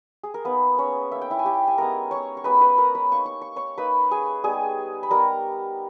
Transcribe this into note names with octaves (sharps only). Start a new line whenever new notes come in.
G#4
A#4
A#3 B3 D#4 B4
C#4 C#5
A#3 D#4 E5
G5
E4 E5
G#5
G4 G5
G#5
G#3 B3 D#4 A#4 A#5
C#5 C#6
C#6
G#3 B3 D#4 B4 B5
B4 B5
A#4 A#5
B4 B5
A#3 D#4 C#6
C#6
C#6
C#5 C#6
A#3 D#4 B4 B5
G#4 G#5
G3 B3 D#4 G#4 G#5
B5
G3 B3 D#4 A#4 A#5